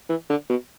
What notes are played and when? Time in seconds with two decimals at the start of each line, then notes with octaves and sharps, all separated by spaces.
0.09 E3
0.30 D3
0.50 B2